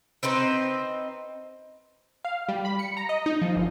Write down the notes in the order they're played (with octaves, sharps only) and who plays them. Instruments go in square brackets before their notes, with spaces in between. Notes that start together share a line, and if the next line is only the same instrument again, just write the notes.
[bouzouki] C4 D#4 B4 C5
[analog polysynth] F5
G3
B5
C#7
A#5
D#5
D#4
F3
G1